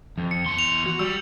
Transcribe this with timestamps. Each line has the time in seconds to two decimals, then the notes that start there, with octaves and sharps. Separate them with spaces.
0.18 F2
0.31 C#7
0.46 E2 C6
0.58 F7
0.86 F#4
0.99 G3 E6